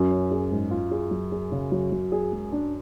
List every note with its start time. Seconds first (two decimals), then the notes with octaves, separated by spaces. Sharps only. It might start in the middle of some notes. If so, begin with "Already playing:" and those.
Already playing: F#2
0.11 C#4
0.31 G#4
0.52 G#2
0.71 F4
0.91 G#4
1.11 F#3
1.32 G#4
1.52 C#3
1.72 F#3
1.92 F#3
2.12 G#4
2.32 G#3
2.52 D4